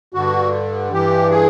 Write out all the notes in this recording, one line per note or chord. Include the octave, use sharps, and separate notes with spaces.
G2 D3 F#4
G2 E3 G4
G#4